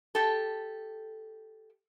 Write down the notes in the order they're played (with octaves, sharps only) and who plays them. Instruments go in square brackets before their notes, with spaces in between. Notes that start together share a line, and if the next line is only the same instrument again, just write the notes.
[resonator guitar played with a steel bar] G4 A4